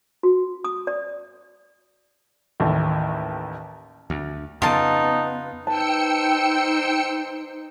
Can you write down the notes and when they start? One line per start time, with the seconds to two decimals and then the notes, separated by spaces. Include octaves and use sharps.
0.23 F#4
0.64 D#6
0.87 D5
2.60 A1 D#2 A2
4.10 D2
4.62 F2 C#3 B3 D#4 F4 A5
5.67 D#4 B4 C5 G5 A5 E6 C#7